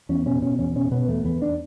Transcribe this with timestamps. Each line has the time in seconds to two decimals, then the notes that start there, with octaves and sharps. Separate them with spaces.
0.09 E2 C#4
0.26 B2 C#4
0.42 B2 C#4
0.59 E2 C#4
0.76 B2 C#4
0.91 B2 B3
1.08 E2 A3
1.24 E2 B3
1.42 D4